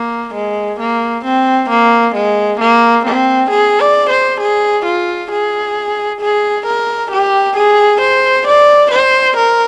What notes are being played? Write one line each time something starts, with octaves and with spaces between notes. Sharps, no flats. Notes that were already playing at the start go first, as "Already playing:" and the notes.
Already playing: A#3
G#3
A#3
C4
A#3
G#3
A#3
C4
G#4
D5
C5
G#4
F4
G#4
G#4
A#4
G4
G#4
C5
D5
C5
A#4